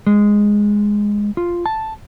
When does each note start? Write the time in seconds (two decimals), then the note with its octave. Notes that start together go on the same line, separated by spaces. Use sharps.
0.06 G#3
1.37 F4
1.66 A5